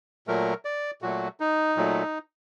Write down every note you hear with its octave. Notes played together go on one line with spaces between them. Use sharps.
A#2 F#3 A3 A#4
D5
A#2 F#3 A3 F#4
D#4
A#2 F#3 A3